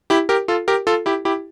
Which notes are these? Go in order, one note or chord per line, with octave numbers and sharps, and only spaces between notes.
E4 G4
G4 A#4
F4 A4
G4 A#4
F4 A4
E4 G4
E4 G4